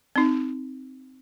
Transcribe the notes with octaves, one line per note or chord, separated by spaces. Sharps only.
C4 D#4